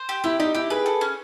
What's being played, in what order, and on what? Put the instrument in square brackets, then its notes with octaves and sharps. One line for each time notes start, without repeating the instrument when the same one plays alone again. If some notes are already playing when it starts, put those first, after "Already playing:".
Already playing: [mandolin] C5
G4
[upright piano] E4 [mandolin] G4
[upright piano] D#4 [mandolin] G4
[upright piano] E4 [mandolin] G4
[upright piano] G#4 [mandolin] B4
[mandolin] A4
C#4